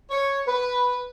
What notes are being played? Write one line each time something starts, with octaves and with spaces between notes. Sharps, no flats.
C#5
B4